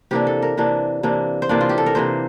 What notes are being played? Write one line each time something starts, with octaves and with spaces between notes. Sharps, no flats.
C3 E3 A#3 D4 G4
A4
A#4
C3 E3 A#3 D4
C3 E3 A#3 D4
C5
C3 E3 A#3 D4 D5
F4
G4
A4
A#4
C3 E3 A#3 C5